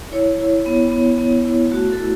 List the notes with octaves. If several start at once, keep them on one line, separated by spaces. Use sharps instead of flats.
E4 C#5
E4
B3
B3
B3
E4
A3 F#4
A4
E4